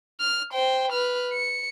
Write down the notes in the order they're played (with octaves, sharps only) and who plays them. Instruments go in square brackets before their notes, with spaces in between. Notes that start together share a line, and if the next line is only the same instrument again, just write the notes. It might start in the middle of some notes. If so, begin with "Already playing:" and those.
[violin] F6
C5 G5
B4 F6
C#7